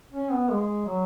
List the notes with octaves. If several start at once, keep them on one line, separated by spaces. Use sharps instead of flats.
C#4
B3
G#3
F#3